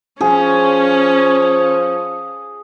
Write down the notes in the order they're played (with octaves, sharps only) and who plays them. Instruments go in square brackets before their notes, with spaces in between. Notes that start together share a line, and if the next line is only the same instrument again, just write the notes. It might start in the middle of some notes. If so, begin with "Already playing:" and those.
[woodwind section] F3 [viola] C#4 [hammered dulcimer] G#4